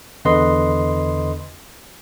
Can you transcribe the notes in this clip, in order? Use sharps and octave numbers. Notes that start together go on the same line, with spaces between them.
E2 D3 B4 D#5 C6